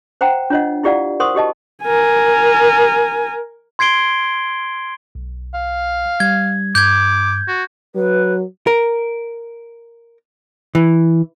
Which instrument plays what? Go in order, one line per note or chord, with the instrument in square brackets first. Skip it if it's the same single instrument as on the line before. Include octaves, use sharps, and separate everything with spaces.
[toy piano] C5 F#5 G5 A#5
D4 F4 C#5 D#5 F#5
E4 F4 G4 D5 F5 F#5
A#4 C5 F#5 C6 C#6 D#6
F#4 G4 D#5 A5
[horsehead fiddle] A#4 G#5
[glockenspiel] C6 G#6 C7 D7 G7
[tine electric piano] B1
[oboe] F5
[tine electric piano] G3 [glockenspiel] G#6
[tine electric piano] G2 [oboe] D6 [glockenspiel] G6 G#6
[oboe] F#4
[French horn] F#3 [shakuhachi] B4
[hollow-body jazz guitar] A#4
E3